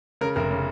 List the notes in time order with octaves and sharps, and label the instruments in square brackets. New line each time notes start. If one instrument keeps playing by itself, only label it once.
[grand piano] C#3 A#4
F1 A#4
C#3